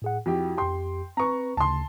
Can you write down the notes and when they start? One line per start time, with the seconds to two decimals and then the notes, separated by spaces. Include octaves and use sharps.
0.02 A2 G#4 F#5
0.26 F2 E4 F#4 G4
0.57 F2 G4 G5 C6
1.17 C4 B4 A#5 C#6
1.57 D2 C#3 A5 C6